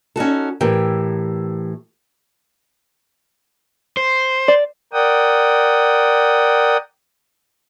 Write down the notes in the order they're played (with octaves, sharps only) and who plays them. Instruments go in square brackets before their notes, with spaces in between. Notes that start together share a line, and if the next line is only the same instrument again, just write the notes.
[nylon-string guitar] C#4 D#4 F#4 A4
A2 E3 G4 A#4 G5
[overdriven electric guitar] C5
[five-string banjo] D5
[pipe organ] A#4 D5 F#5 G5 D#6